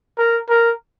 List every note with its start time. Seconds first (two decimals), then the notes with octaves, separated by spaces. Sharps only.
0.18 A#4
0.49 A#4